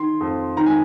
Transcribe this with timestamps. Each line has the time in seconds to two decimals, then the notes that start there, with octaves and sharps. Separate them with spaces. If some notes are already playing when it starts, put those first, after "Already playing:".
Already playing: D#3 C6
0.20 F2
0.57 D#3 A#5
0.66 G#5